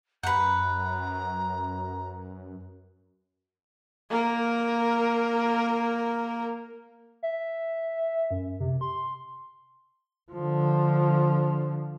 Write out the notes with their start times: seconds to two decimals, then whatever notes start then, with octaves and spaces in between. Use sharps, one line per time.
0.23 F#2 B4 F#5 A#5
4.10 A#3 A#4
7.23 E5
8.31 F#2
8.60 C3
8.81 C6
10.32 D3 F3